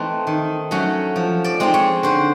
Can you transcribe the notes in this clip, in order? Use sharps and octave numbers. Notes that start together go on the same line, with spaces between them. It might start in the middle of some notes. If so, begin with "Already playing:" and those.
Already playing: E3 A3 C4 D#4
D#3
F#3 A3 C#4
F3
D5
G#3 C4 D#4
C#5
D3 C5